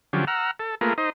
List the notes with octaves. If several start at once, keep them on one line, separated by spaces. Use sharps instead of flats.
D3 F3 F#3 C#4 G4
F#5 A#5 E6 F6
A4
A3 A#3 F4 G#4 A#4 B4
D#4 C5 D#5